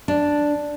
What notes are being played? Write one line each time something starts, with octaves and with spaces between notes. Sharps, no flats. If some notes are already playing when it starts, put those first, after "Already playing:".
D4